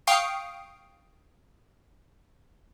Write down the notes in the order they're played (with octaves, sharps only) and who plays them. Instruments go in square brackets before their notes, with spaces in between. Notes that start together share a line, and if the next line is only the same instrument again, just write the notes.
[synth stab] F5 G5 C#6 D#6 C7 D7